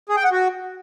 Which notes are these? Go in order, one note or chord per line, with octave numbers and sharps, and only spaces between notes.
G#4
G5
F#5
F#4